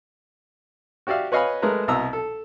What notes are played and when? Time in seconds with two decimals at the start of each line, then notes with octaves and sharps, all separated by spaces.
1.07 F#4 G4 D5 E5 F5
1.32 B4 C#5 D#5 F5 G#5 B5
1.62 G#3 A3 A#4 B4 A#5
1.88 C2 B2 A#5 E6
2.13 A4